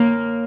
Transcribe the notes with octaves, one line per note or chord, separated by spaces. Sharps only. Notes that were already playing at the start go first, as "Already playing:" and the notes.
Already playing: A#3 C#5